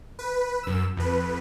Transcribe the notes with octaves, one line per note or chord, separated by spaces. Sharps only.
B4
F#2 E6
F2 B4